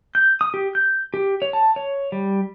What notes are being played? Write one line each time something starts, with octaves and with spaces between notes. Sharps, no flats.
G6
D#6
G4
G6
G4
C#5
A5
C#5
G3